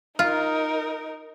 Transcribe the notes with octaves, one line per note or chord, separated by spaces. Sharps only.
D#4 F4 A#4